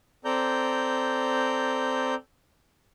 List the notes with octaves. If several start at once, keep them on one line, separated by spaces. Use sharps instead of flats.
C4 A4 D5 A#5 G6